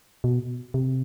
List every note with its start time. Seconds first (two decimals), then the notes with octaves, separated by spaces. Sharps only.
0.24 B2
0.74 C3